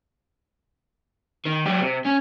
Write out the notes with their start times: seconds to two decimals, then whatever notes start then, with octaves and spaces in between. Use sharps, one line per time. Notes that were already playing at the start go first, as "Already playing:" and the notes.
1.45 D#3
1.66 F#3 G4
1.81 C3
2.06 C#4